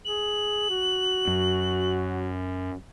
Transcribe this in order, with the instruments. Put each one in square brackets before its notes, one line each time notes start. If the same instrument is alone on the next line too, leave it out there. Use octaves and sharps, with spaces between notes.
[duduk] G#4 [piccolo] F#7
[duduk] F#4
[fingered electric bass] F#2